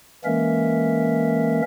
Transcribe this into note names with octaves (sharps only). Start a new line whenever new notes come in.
E3 G#3 A#3 C#4 A#4 E5